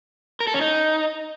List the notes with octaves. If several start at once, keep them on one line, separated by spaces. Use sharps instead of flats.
A#4
A4
C#4
D#4